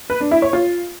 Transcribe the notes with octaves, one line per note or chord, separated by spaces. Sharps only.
B4
D4
E4
C#5
F4